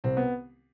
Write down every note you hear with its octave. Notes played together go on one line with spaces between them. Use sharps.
C2 C4
B3